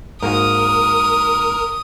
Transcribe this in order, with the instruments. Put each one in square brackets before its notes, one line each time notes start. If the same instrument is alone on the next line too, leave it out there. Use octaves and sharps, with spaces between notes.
[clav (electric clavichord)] G#2 A#3 F#4 [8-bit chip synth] A#4 [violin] D#6